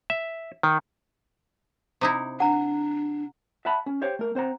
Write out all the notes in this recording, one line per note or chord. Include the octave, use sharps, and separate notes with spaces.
E5
D#3
C3 D#4 E4
D4 F#5 A#5
E5 F#5 A5 B5
C#4
G4 C5 C#5 F5 G5
A3 A#4
C4 C5 F#5 A#5